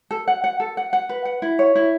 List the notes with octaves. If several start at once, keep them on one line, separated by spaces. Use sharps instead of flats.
A4
F#5
F#5
A4
F#5
F#5
B4
F#5
E4
C#5
E4